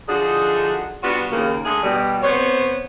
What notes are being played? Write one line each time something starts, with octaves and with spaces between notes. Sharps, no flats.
D3 F3 D4 D#4 F#4 G#4
G3 B3 D4 F4 F#4
D#2 C#3 A#3
D3 G#3 A3 G#4
B2 G3
C3 B3 C5 C#5